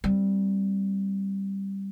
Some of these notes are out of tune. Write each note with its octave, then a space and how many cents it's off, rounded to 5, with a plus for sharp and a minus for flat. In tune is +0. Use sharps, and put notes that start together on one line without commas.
G3 +0 C4 +0